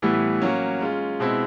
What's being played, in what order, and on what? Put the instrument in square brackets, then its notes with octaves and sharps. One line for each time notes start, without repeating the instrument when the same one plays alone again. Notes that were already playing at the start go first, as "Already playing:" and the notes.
[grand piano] A2 E3 G3 B3 E4
F#3 A#3 C#4
G#3 C#4 F4
B2 G#3 C4 E4